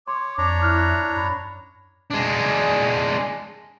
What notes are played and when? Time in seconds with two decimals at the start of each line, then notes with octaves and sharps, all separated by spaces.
0.08 C#5 C6 D6
0.38 F2 D4 C#5 A#5
0.62 E4 F6 F#6
1.16 F#2 B5
2.10 G#3 D4